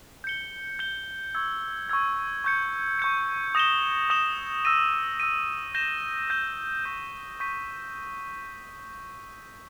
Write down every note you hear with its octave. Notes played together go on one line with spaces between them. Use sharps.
G6 C#7 G7
G6 C#7 G7
C#6 E6 G#6
C#6 E6 G#6
C#6 G6 C#7
C#6 G6 C#7
D#6 A#6 E7 G7
D#6 A#6 E7 G7
E6 A#6 D#7
E6 A#6 D#7
G6 A#6 E7 G7
G6 A#6 E7 G7
C#6 G6 B6 D#7
C#6 G6 B6 D#7